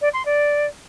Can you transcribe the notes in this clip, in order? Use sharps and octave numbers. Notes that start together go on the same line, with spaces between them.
D5
C6
D5